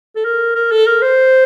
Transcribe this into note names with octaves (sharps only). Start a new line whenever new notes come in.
A4
A#4
A#4
A4
A#4
C5